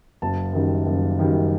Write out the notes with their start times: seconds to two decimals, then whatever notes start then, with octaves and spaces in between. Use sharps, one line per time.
0.22 F#1 A5
0.53 F#2 D#3 G3
0.86 F#1
1.19 F#2 D#3 G3